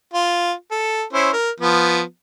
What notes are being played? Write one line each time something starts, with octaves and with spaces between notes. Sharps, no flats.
F4
A4
C#4 E4 C5
A#4
F3 B3